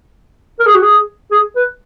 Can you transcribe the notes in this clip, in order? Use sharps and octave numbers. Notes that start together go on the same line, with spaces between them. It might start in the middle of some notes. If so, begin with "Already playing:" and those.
A#4
G#4
F#4
G#4
G#4
B4